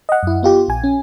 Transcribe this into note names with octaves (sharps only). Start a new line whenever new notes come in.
D#5 F#5
F#2 E4
B3 F4 G4
A#1 G#5
C#4